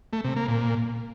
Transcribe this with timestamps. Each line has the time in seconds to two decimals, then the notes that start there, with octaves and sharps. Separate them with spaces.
0.13 A3
0.25 C3
0.36 A#3
0.48 A#2